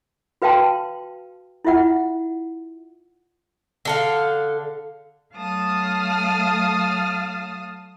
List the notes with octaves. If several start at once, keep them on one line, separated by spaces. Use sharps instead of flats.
F#4 B4 F5 G5 A5 C6
E4 F4 E5 F#5
D3 A4 F5
F#3 A3 F5 A5 D#6 F6